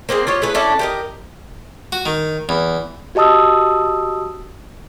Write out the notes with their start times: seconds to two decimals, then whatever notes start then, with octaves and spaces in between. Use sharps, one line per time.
0.09 A#3 C4 G4 G#4
0.27 F4 G4 C#5 D#5
0.42 A3 E4 G#4 B4
0.54 C#4 D4 E4 A4
0.79 G4 A#4 D#5
1.92 F#4
2.06 D#3
2.49 E2
3.15 F#4 G4 D#5 A5 D#6 E6